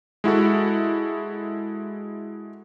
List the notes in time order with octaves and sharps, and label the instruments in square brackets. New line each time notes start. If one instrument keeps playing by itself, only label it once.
[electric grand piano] G#3 E4 F#4 A4